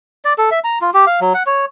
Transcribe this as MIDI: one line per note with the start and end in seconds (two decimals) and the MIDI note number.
0.25 0.33 74
0.38 0.50 69
0.51 0.59 76
0.64 0.78 82
0.82 0.90 65
0.94 1.05 67
1.07 1.20 77
1.21 1.33 54
1.34 1.43 78
1.47 1.65 73